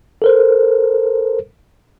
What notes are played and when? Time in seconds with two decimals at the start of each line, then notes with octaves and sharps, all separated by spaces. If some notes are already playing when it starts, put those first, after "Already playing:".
0.22 A4 A#4 C5